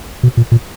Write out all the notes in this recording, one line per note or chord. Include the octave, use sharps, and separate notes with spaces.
B2
A#2
A#2